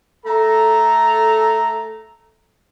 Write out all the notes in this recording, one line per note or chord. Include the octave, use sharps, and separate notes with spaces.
A3 A4 A#5